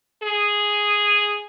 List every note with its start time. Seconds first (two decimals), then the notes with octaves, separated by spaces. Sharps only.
0.23 G#4